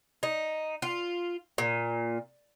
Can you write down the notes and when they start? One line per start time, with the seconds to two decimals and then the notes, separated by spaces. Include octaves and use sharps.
0.23 D#4
0.82 F4
1.58 A#2